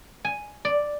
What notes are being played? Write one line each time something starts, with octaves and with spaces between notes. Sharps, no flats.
G#5
D5